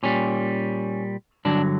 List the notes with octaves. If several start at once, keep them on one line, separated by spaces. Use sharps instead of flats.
A#2 G3 C#4
G2 D3 F#3 D4